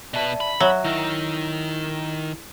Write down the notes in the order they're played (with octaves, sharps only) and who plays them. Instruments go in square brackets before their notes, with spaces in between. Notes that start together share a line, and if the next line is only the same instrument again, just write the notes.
[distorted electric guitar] B2 B4 [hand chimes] D5 E5 A5
[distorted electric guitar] B5
[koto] F#3 [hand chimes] E5
[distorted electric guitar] D#3 [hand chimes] E4 E6 A#6